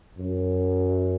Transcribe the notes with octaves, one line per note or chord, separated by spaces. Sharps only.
F#2